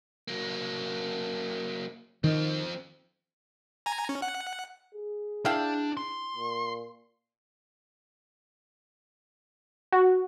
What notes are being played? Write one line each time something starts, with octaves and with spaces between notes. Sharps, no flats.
F#3 A#3
D#3 F3 C4
G#5 A#5
C#4
F#5
G#4
D4 E4 F5 G5 A5
C6
A#2
F#4